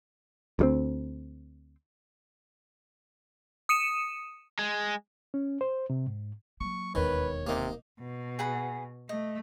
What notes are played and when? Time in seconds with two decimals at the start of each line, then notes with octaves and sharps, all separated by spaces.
0.59 D2 G3 C4
3.69 D#6 C#7 D#7 E7
4.59 G#3
5.34 C#4
5.61 C5
5.90 C3
6.07 G#2
6.61 F#3 A#3 C#6
6.95 E1 D#2 D#3 B4 C#5
7.47 C3 A#3 D#4
8.00 B2
8.39 G#4 F#5 B5
9.09 A3 D#5